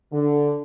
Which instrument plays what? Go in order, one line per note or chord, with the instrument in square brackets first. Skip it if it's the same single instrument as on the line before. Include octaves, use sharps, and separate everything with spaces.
[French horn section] D3